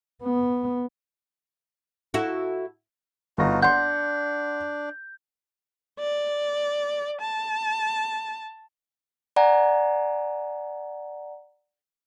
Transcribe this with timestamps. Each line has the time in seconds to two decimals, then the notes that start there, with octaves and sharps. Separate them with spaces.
0.23 B3
2.14 E4 F#4 A4
3.38 G1 D#4 F4 F#4 A#6
3.62 D4 F#5 C6 G6
5.99 D5
7.21 A5
9.36 D5 F#5 G#5 A#5